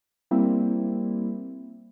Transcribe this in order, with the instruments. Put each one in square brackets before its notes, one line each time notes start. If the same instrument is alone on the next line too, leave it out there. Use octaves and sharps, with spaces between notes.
[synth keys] G3 A#3 C4 E4